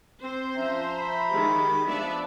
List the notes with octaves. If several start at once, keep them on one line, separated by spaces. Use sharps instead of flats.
C4 C5
F3 C#4 E5 A#5
B5
D#3 G#3 G4
F3 B3 D4 D5 E5